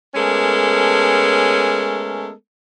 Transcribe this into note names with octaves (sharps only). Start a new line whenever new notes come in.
G#3 A3 B3 C#4 A4 A#4